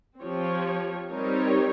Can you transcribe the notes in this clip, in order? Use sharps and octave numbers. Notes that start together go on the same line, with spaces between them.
F3 C4 G4 C#5
G3 C4 D#4 A#4 C#5